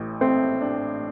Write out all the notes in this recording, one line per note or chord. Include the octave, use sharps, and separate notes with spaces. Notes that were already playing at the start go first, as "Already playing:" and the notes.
Already playing: A1 A2
A3 C4
D4